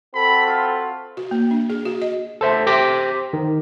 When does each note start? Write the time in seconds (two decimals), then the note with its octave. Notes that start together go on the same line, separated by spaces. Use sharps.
0.14 C4 F#4 A4 B5
0.47 F4
1.17 F#4
1.31 A#3
1.51 D4
1.70 G#4
1.85 F#4
2.02 D#5
2.41 A4 C5 E5
2.67 G4 C5 D6 A#6 B6
3.33 D#3